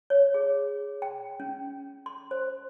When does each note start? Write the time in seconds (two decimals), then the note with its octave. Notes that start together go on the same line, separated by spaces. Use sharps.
0.10 C#5
0.34 G#4
1.02 G5
1.40 C#4
2.06 C6
2.31 C5